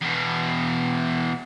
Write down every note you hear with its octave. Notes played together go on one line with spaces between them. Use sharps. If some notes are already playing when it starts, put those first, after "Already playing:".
E2 B2